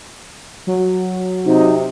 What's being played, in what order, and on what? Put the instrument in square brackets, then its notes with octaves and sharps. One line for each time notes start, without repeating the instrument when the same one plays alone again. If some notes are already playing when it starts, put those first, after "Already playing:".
[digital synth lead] F#3
[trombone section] C3 [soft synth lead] D#4